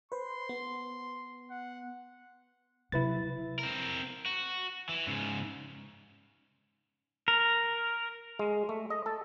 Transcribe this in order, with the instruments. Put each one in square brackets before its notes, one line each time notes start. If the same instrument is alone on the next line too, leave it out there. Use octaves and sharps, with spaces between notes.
[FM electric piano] B4 C5 [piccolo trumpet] C6
[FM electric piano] B3
[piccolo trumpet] F#5
[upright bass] C3 F#3 [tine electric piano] E4 B4 A6
[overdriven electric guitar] C4 A#4
F#4
E3
G#2 C#3
[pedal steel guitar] A#4
[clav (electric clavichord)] G#3
A3
D#5
A4